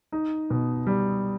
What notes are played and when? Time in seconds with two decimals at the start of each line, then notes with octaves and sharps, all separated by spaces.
0.12 D#4
0.50 B2
0.87 G3